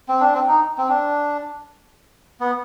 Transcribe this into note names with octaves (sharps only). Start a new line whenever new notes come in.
C4
D4
C4
D#4
C4
D4
B3